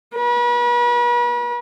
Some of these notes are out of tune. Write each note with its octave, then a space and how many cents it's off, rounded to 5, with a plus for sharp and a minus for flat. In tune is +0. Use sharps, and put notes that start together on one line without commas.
B4 -40